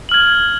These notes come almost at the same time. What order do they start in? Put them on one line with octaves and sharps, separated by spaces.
F#7 F6 G#6